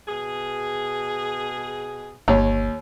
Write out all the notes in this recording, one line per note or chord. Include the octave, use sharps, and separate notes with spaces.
B2 G#4
G1 D#2 C#5 A#5